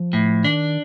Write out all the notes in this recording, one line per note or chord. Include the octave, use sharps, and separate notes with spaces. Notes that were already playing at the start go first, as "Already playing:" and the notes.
Already playing: F3
A2
D#3 D4